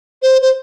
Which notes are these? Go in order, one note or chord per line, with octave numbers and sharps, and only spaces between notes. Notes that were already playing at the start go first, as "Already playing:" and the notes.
C5
C5